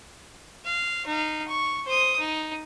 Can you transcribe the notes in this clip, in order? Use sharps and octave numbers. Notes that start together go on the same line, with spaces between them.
F5
D#4 F5
C#6
C5 D#6
D#4